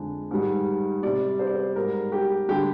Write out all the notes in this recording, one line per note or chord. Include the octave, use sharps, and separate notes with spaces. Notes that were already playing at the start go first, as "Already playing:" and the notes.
Already playing: F2 D3 G#3
G#2 D#3 G3
C3 G3 D5
C5
D5
C5
G#2 G3 A#4
G4
D3 G3 G4